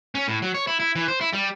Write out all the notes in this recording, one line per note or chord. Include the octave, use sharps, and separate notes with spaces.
C#4
A2
F#3
C#5
E4
E4
E3
C5
E4
G3